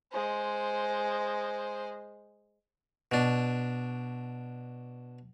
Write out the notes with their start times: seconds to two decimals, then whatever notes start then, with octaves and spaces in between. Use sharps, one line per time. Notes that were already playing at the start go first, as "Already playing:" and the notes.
0.12 G#3 C5
3.12 B2 D4